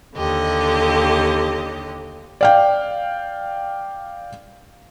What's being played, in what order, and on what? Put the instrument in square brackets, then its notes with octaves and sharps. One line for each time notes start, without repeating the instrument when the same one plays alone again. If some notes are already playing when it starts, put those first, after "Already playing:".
[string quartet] D#2 D3 G4 D#5
[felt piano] D5 F5 G5